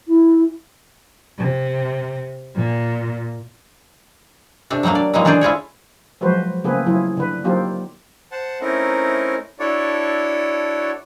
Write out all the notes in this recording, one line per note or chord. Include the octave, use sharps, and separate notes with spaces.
E4
C3
A#2
C3 A3 D4
F#3 G3 A3 A#3 D4
D5
D#3 E3 F#3 G#3 A#3
A3 D4 G#4 C5 D5
E4 F4 G#4 C#5
F3 F#3 G#3 F#4 B4 C5
C#3 A3 A#3 C4 G#4 B4
F#3 E4 F4 G#4
D3 B4
F#3 A#3 C4 D#4 F4 G4
C5 F#5 A5
A3 C4 C#4 D#4 E4 A#4
D4 E4 F#4 A4 C#5 D5